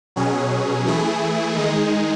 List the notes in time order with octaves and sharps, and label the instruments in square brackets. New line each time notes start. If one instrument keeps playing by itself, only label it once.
[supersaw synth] B2 F#3 C#4 G#4
E3 A3 E4 G#4
D#3 G#3 D#4 G#4